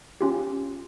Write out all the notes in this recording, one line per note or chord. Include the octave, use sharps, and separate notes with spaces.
C#4 F4 G4